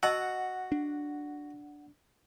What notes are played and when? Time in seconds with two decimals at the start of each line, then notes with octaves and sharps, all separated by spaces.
0.03 F#4 D#5 F#5 A5 E6
0.72 D4